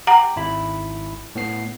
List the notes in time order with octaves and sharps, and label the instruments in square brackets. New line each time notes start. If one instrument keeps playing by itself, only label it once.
[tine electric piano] G4 [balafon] F#5 A#5
[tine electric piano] G#1 E4 B5
A2 B3 C7